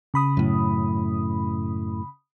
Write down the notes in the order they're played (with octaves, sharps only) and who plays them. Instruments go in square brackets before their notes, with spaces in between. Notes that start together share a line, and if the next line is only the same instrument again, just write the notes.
[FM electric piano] C#3 B5 D#6
[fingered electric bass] F#2 A2